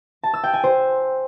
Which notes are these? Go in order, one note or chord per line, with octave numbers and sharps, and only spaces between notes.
A5
E6
G5
G#5
C5